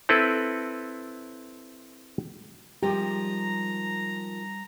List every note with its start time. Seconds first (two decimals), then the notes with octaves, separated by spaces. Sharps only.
0.09 C4 E4 A4 B4
2.83 D#3 F3 G3 G#3 G4 E5 G5 A#5